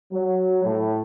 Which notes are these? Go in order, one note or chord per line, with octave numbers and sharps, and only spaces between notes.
F#3
A2